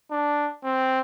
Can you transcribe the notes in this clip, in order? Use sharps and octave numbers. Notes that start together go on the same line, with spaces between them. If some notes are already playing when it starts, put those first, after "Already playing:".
D4
C4